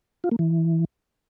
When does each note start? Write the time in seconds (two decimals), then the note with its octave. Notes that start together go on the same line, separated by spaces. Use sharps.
0.24 F4
0.31 A#3
0.39 E3